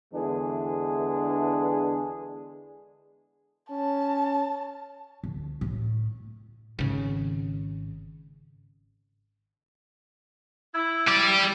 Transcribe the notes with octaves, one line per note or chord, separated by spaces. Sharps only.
E2 D3 E3 G#3 D4 G#4
C#4 A5
D2
A2
G#1 C#3
E4
G3 D5